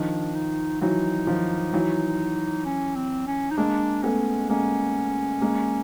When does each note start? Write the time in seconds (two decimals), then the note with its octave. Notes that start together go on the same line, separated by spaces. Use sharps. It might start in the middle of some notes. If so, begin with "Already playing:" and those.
Already playing: D#3 F3 D4
0.35 D#4
0.81 E3 F#3 D#4
1.27 D#3 F3
1.73 E3 F#3
2.66 C#4
2.96 C4
3.27 C#4
3.51 D#4
3.57 G#3 A#3 D4
4.03 A3 B3 C#4
4.49 G#3 A#3 C#4
5.41 G#3 A#3